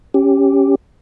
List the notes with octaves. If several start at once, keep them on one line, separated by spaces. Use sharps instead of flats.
C#4 G4